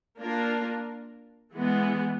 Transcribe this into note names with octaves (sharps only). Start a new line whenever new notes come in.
A#3 D4 F4 A#4
E3 G#3 B3